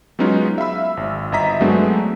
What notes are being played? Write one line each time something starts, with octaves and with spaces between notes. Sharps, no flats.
F#3 G#3 B3 C#4 D#4 F4
E5 F5 B5 E6
G#1
G1 D#5 E5 A#5 B6
F#3 G#3 A3 B3 C4 D4